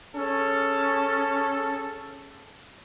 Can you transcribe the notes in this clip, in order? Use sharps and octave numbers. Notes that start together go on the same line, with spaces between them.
C#4 G#4 A4